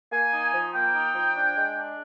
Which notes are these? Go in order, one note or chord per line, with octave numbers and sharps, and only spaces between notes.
A#3 G#5
D#4
F3
A#3 G5
D#4
F3
D4
G#3
D4